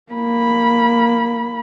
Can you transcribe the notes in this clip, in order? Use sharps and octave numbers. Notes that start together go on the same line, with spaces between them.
A#3 B5